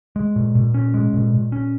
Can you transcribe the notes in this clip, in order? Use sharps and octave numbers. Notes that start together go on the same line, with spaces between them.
G#3
A#2
A#2
C#4
G#3
A#2
A#2
C#4